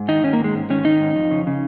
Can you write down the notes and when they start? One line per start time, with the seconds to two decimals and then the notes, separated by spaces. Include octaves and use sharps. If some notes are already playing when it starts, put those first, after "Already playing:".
Already playing: G#2
0.08 D#3 D#4
0.23 D#3 C#4
0.33 A#3
0.39 G#2
0.44 G#3
0.55 G#2
0.70 D#3 C#4
0.85 D#3 D#4
1.00 G#2
1.15 F2
1.31 C#3
1.47 C#3